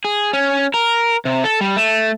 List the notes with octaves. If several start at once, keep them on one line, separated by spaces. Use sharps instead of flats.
G#4
C#4
A#4
C3
A4
G3
A3